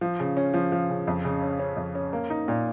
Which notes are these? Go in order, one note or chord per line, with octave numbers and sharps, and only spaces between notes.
F3
C#3
C#4
F3
F3
C#3
F2
C#3
C#4
C#4
F2
C#4
A#3
D#4
A#2